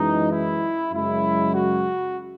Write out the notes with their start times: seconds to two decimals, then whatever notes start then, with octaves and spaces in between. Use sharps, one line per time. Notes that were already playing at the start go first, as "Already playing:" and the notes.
Already playing: F#2 E3 G#3 D#4
0.31 E4
0.92 F#2 C#3 G#3 E4
1.54 F#4